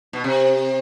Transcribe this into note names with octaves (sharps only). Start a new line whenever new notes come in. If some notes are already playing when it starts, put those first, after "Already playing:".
B2
C3